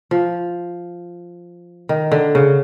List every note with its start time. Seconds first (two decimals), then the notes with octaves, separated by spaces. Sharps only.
0.11 F3
1.89 D#3
2.12 D3
2.35 C#3